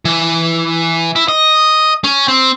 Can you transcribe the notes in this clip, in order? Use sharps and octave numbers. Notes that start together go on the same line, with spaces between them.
E3
E4
D#5
C#4
C4